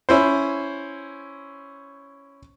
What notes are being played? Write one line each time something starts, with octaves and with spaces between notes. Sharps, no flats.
C#4 E4 C5